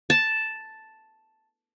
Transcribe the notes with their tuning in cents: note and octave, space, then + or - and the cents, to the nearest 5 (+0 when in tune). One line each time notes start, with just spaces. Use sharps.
A5 +0